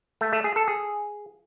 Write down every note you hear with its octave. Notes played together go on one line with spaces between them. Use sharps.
A3
A3
G#4
A4
G#4